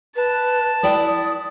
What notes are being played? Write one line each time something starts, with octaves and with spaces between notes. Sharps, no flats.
B4 A5
E4 D5 G5 D#6